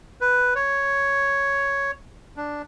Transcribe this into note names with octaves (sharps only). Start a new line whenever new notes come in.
B4
C#5
D4